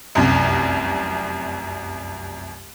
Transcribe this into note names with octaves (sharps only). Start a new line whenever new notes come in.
F1 C2 F#2